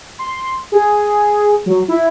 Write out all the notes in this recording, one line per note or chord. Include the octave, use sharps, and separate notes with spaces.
C6
G#4
F#3
E4